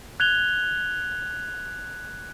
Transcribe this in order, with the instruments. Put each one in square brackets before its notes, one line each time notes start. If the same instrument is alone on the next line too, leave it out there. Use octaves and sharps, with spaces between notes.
[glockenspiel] F#6 G#6 F7 G7